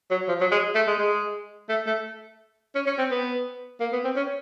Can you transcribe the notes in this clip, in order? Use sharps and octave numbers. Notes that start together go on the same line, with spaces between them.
F#3
F3
F#3
G#3
A3
G#3
G#3
A3
A3
C#4
C#4
C4
B3
A#3
B3
C4
C#4